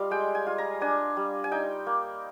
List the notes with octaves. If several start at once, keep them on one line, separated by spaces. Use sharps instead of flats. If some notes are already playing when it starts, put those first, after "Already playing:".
Already playing: G3 F4 D#5 F5
G#3 G5
G#5
F4
A#5
D4 G#5
G3
G#5
D#4 G5
A#3